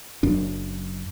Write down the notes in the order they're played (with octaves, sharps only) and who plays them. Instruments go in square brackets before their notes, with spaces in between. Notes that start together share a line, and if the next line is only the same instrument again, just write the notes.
[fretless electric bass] F#1 F#2 D4